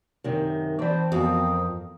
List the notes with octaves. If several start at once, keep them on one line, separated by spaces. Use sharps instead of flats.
F#2 C3 D#3
E3 C4 C5 D5 A5 B5
F2 B3 F#4 A#4 D#6